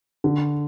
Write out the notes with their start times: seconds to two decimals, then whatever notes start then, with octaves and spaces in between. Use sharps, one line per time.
0.24 D3